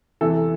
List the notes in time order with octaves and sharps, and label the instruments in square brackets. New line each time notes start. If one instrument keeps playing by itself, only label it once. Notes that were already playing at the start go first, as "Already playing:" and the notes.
[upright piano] E2 C3 E3 A4